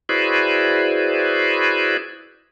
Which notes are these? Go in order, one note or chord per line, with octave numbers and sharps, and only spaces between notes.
E4 F#4 G#4 B4 C5 D5